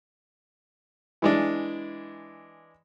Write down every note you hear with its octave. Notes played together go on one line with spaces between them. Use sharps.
E3 G#3 D4